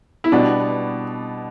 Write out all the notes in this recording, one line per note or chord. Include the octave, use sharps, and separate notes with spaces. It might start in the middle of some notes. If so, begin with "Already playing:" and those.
E4
B2 G3 B3 D4